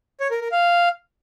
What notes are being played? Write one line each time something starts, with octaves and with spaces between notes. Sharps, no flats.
C#5
A#4
A#4
F5